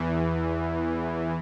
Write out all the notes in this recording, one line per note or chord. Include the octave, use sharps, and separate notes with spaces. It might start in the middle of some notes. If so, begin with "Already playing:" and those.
Already playing: E2 E3